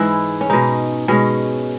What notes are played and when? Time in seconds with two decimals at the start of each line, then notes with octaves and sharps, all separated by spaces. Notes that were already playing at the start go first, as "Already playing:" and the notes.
Already playing: G#2 E3 G#3 E4
0.41 C#4
0.50 B2 G#3 D#4
1.08 B2 G#3 C#4